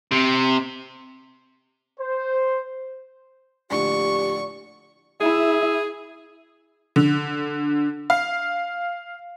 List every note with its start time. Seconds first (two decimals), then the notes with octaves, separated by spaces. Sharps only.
0.11 C3
2.00 C5
3.71 A#1 A2 D3 G4 D5 C#6
5.21 E4 G#4 E5
6.96 D3
8.10 F5